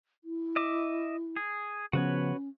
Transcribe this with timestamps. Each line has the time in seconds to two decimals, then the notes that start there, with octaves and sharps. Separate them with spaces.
0.24 E4
0.56 D#5 E5 D6
1.36 G#4
1.93 C#3 F3 B3 C#4 F#4 B4 C#5